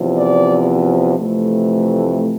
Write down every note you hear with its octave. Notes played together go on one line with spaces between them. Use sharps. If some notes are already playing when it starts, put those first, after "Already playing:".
Already playing: E2 C3 F3
D5
F2 C3 E3 A3